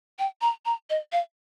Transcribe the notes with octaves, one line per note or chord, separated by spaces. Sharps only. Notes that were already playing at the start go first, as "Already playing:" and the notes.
G5
A#5
A#5
D#5
F5